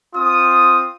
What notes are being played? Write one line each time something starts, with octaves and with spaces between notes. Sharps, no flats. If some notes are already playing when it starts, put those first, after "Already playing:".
C4 F4 D#6